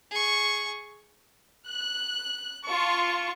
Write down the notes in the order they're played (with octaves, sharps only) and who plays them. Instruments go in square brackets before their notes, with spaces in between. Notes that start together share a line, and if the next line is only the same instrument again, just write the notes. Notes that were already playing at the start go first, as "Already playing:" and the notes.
[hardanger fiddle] G#4 C#6
[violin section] F#6
F4 A5 C#6